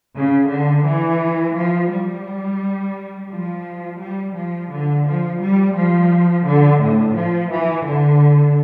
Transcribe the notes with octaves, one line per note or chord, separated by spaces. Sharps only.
C#3
D3
E3
F3
G3
F3
G3
F3
D3
F3
G3
F3
D3
A2
F3
E3
D3